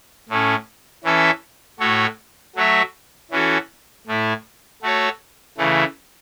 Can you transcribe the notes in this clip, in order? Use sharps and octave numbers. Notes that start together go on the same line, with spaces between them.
A2 A3 C#4
E3 C#4 A4 E5
A2 A3 F#4 A4 C#5
F#3 A3 F#4 C#5 E5
E3 C#4 F#4 A4
A2 A3 E4
A3 F#4 A4 C#5
C#3 E3 A3